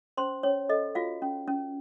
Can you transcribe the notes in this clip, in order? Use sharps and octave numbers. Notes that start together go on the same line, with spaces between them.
C#4 C5 C6
C#4 C#5
A4 D#5
F4 F#4 F5
C#4
C#4